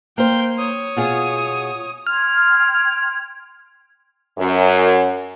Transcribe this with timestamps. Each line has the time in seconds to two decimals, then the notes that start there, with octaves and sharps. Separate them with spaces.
0.18 A#3 C5 G5 G6
0.57 C#5 D#6
0.97 B2 F4 G#4
2.06 G5 C6 F6 G#6
4.38 F#2